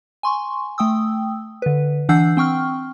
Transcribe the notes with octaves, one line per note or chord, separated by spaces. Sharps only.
G#5 C6 C#6
A3 G5 D#6 E6
D3 B4
E3 D4 F#5 E6 G6 C7
C4 G5 C#6 F6